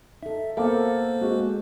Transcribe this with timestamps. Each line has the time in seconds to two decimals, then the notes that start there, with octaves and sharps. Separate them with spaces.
0.23 D#4 A4 E5
0.57 A#3 B3 A4 A#4 C5 F5 D6
1.21 G#3 C4 F#4 G#4